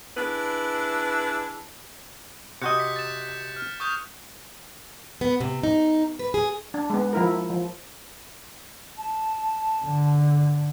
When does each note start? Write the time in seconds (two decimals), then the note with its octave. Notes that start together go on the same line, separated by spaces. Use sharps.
0.17 D4 E4 G#4 B4
2.62 C3 F#4 D#5 F#6 G6 C#7
2.79 B6
2.96 A6 E7
3.56 F6
3.80 C#6 D#6 G6
5.21 B3
5.40 C3
5.63 D#4
6.19 B4
6.34 G#4
6.74 D4
6.90 G#3 B3
7.13 F3 E4 A#4
7.50 F3
8.98 A5
9.85 D3